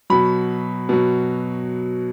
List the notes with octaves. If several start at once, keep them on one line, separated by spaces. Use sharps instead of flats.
B2 F#3 B5
B2 F#3